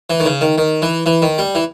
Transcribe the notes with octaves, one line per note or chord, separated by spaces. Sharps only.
E3
D#3
C#3
D#3
D#3
E3
E3
D#3
G3
E3